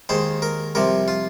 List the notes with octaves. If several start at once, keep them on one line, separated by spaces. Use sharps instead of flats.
D#2 D#3 G#3 C5
A#4
C2 C3 F3 A#4
F4